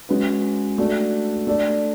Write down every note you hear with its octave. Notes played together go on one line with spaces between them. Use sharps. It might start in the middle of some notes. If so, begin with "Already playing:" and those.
G#3 C#4 F#4 B4
A3 D4 F#4
A3 D4 A4 D5